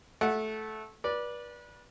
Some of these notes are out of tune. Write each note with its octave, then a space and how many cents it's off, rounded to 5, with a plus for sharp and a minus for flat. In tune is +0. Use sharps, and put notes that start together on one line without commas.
A3 -15 F#5 +0
B4 -30 D5 +0